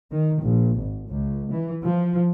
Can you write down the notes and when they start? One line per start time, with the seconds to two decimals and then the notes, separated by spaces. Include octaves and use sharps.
0.11 D#3
0.42 A#1
0.78 G#1
1.09 C#2
1.51 E3
1.82 F3